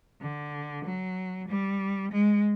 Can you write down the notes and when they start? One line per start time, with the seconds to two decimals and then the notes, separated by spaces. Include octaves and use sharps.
0.21 D3
0.84 F#3
1.48 G3
2.12 G#3